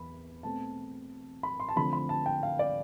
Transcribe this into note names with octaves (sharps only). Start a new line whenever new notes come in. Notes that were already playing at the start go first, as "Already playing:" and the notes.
Already playing: E2 B5
B2 A3 C4 A5
B5
C6
A5
D3 F3 A3 C4 B5
B5
A5
G5
F5
D5